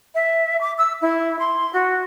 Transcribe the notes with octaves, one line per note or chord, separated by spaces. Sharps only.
E5
D6
E6
E4
C6
F#4